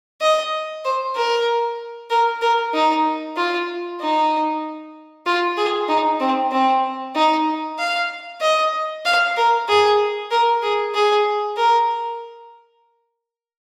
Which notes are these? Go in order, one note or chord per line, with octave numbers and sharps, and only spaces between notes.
D#5
C5
A#4
A#4
A#4
D#4
F4
D#4
F4
G#4
D#4
C4
C4
D#4
F5
D#5
F5
A#4
G#4
A#4
G#4
G#4
A#4